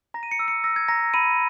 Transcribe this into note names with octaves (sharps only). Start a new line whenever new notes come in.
A#5 A#6
D#7
C#7
E6
C#7
E6 A#6
G#6
A#5 A#6
B5 D#7